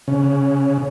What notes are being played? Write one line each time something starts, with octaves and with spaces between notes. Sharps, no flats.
C#3